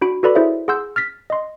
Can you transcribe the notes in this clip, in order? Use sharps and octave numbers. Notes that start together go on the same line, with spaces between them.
D4 F#4 B5 D7
F#4 A4 B4 D5 B5
E4 G#4 C5 C#5 E5
G#4 F#5 C6 E6 G6
F6 A6 B6
D#5 C6